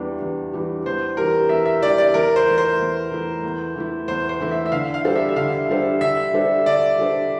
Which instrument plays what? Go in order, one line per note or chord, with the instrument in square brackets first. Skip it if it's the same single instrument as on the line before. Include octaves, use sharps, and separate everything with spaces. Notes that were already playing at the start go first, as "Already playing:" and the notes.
Already playing: [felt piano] E2 E3 G3 D4 G4
E2
E3 G3 D4 G4
[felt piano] E2 [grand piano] C5
[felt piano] E3 G3 D4 G4 [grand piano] A#4
[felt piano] E2 [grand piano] E5
[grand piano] E5
[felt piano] E3 G3 D4 G4 [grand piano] D5
[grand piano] D5
[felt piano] E2 [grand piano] A#4
[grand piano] C5
[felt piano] E3 A3 E4
[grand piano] C5
[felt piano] E2
E3 A3 E4
E2
E3 A3 E4
[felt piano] E2 [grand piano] C5
[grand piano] C5
[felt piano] E3 A3 E4
[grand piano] E5
E5
[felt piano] D3 [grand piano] F5
[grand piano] F5
[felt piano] G3 D4 A4 C5
[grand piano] E5
E5
[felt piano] D3 [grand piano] F5
[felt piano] G3 D4 A4 C5
[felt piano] D3 [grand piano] E5
[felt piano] G3 D4 A4 C5
[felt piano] D3 [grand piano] D5
[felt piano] G3 D4 A4 C5